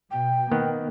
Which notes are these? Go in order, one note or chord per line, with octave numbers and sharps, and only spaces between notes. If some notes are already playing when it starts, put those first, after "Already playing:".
B2 G5
D#3 A#3 B3